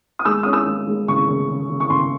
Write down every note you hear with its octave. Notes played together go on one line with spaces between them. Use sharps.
D#6
G#3 E6
C#4 D#6
E6
G#3
G#3
C#3 C#6
C#3
C#3
C#3
C#6
C#3 C6